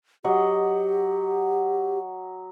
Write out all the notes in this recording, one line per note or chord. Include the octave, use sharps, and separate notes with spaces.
F#3 G4 D#5 F#5